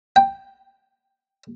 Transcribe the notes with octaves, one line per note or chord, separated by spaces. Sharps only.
G5